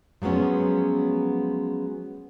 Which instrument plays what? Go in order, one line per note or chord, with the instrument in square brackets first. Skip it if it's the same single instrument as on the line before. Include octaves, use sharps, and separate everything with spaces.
[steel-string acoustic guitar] F3 F#3 G#3 B3 C#4